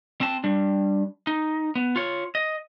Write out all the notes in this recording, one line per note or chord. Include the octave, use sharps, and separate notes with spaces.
C4 A5
G3 D4
D#4
B3
F4 C#5
D#5